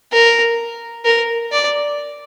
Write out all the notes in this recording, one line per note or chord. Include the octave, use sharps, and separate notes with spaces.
A#4
A#4
D5